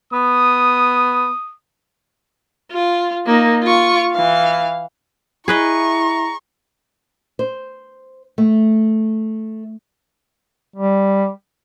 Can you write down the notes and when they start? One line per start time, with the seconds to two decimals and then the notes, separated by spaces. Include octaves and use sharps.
0.13 B3 D#6
2.72 F4
3.26 A#3 D#4
3.63 F4 C#6
4.13 E3 F5
5.48 E4 G#4 B4 D#5 A#5 C#6
7.39 C5
8.38 A3
10.76 G3